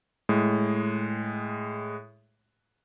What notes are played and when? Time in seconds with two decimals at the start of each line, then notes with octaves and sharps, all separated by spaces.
0.29 A2 G#3